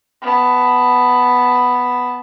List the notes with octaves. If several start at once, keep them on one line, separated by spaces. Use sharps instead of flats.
B3 A5